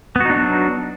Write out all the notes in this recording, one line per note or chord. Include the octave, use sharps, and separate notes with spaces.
F#3 B3 D4 D#4 F#4